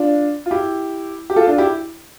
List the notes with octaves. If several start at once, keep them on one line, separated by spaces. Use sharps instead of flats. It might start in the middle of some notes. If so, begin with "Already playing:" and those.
Already playing: D4 F4
F4
E4 G4
G4
F4 A4
D4 F4
E4 G4